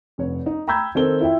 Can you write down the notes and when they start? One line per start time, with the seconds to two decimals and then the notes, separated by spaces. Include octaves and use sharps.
0.18 F1 C#5
0.46 D#4
0.67 G5 A#5 B5 E6 G6 G#6
0.95 D#3 C4 A4 G7
1.21 E4 F4 E5 G5